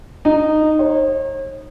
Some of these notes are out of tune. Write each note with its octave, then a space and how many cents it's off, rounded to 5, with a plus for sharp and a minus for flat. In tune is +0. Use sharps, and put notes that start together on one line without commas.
D#4 -15
C#5 -45